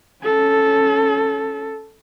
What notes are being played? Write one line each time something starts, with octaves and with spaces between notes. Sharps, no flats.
C#4 A4